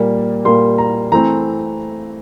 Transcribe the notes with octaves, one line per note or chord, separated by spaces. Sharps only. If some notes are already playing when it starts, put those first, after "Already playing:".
Already playing: A#2 G3 A#3
A#2 G3 A#3 C6
A#5
E3 A3 C4 A#5